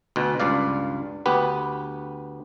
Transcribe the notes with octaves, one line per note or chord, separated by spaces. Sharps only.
D2 B2
C#2 G2 D5 F5
D2 B3 G4 B4